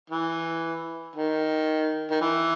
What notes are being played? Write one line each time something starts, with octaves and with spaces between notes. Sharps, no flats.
E3
D#3
D#3
E3